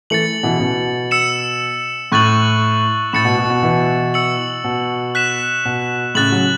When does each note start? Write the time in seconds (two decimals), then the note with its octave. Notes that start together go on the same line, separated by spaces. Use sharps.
0.10 E3 A3 A6 C#7 F#7
0.43 B2 E3
0.56 C#3
0.60 B2
1.11 E6 C#7 E7
2.12 A2 C#6 F#6 A6 F#7
3.13 A2 A6 C#7 E7
3.25 B2
3.39 B2
3.50 B2
3.63 B2 E3
4.14 E6 C#7 F#7
4.64 B2
5.15 F#6 B6 E7
5.65 B2
6.15 A2 C#3 F#6 A6 F#7
6.32 C#3 F#3